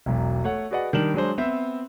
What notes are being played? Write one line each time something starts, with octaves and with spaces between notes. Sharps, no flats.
E1 B1
A3 C#5 F#5
F#4 G#4 B4 D5 D#5 F#5
D#3 G3 D4 E7 F#7
F#3 G#3 D4 C5
B3 C4 C5 E5